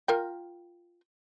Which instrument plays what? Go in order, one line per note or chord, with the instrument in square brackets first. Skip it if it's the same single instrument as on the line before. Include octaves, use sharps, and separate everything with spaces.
[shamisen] F4 A#4 G5